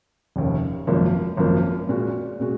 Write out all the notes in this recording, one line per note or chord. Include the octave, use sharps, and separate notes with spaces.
F1 D#2 C#3
G#1 F#2 F3 A#3
G#1 F#2 F3 A#3
A#2 G#3 C#4 F#4
A#2 G#3 C#4 F#4